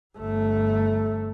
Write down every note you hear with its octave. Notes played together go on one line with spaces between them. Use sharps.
G1 A3